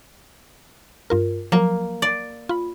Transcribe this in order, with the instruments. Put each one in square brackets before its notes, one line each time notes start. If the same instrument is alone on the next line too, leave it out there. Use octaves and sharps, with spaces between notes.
[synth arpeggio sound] G2 F4 A#4
[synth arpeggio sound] F3 F#3 [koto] A#3
[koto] D5
[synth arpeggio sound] F4 B5